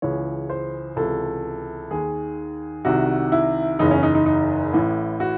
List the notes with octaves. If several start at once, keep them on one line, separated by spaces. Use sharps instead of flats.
C#2 C#3 E3 C#5
C5
C#2 C3 E3 A4
D#2 D#3 G#4
C2 C3 D#3 F#4
E4
F#1 E2 C#3 D#4
C#4
D#4
D#4
D#4
A1 A2 E3
F#4